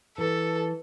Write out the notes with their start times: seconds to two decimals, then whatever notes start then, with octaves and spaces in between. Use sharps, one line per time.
0.18 E3 A4